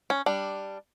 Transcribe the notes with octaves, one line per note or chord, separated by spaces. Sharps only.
C#4
G3 D4